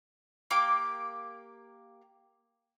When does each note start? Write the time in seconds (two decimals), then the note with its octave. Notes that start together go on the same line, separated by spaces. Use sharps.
0.50 A#3 G4 D6